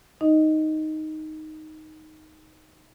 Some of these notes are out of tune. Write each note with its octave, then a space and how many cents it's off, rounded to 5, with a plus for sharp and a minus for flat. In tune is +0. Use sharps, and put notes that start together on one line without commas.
D#4 +0 D#5 +0